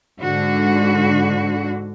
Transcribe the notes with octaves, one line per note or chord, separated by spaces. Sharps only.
G#2 D3 F#4